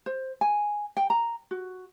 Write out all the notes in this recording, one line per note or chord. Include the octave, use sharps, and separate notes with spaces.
C5
G#5
G5
A#5
F#4